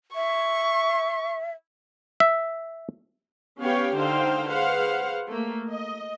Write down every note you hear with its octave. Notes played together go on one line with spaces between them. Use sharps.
E5 C#6
E5
B3 C#4 G4 C#5 F5 G5
D3 D#4 C5 F5 G5
G#4 B4 C5 F5 F#5
A3 A#3
D#5